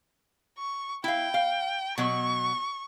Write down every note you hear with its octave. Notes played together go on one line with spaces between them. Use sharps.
C#6
E4 F5 G5
F5
B2 F#3 C#6